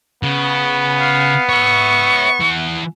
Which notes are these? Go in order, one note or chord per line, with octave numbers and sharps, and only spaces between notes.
C#3 B3
F5
C#5 E5 C#6
E3 F#5